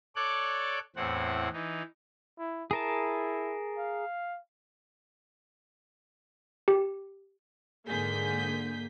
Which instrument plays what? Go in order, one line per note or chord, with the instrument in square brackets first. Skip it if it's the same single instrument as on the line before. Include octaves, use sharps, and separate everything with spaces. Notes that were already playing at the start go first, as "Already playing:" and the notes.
[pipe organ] A4 C#5 D5 D6 F#6
E2 A2 C4 F#5
E3 D#4
[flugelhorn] E4
[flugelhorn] E4 [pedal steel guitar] G#4 A#4 A5
[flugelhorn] F5
[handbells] G4
[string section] G#2 D3 A#3 G#4 G6 B6